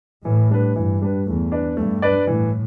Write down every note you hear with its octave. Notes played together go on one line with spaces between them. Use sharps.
A2 E3
G3 D4 B4
G2 E3
G3 D4 B4
E2 A3
D4 B4 D5
G2 A3
D4 B4 D5
A2 E3